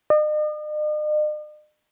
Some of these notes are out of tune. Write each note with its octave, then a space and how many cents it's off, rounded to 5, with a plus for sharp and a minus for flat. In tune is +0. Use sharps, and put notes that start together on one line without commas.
D#5 -45